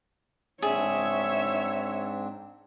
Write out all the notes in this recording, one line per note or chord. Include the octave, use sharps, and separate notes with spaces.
G#2 C4 D4 G#4 C#5 E5